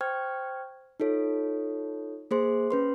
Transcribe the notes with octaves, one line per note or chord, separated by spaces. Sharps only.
C5 G5 C#6 F6 G#6
D#4 F4 A4 C#5
A#3 G#4 C5 C6
C#4 B4 C6